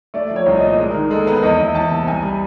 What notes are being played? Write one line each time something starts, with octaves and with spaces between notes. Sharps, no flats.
A3 D5
D5
F3
C#5
C2 D5
D#5
A#2
D#5
G#3 D5
A#4
D#3
G#3 A4
A#4
B3 B4
E2 D#5
D#5
E2
E5
E2 A5
C3
C2 G#5
G3